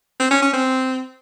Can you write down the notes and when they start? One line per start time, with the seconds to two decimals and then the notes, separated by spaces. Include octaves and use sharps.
0.20 C4
0.31 C#4
0.42 C#4
0.54 C4